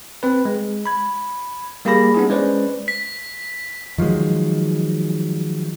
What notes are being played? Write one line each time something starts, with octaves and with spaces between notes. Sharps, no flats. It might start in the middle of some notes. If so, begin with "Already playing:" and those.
C4 B4
G#3
B5 G#6
G3 A#3 G4 G#4 B5 A#6
B3 D4 E4 G#4
G#3 C#4 B4 C5 D5
B6
D#3 F3 F#3 G#3